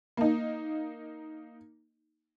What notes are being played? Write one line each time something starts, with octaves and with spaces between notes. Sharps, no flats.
A#3 D#4